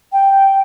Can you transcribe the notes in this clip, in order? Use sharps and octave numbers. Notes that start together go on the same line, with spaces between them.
G5